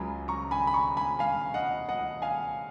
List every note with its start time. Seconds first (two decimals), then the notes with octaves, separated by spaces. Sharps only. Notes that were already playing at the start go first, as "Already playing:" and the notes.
Already playing: C#2 C#3 F#3 G#5 B5
0.28 A#5 C#6
0.51 G#5 B5
0.67 B5
0.74 A#5 C#6
0.97 G#5 B5
1.19 F5 G#5
1.54 D#5 F#5
1.89 D#5 F#5
2.22 F5 G#5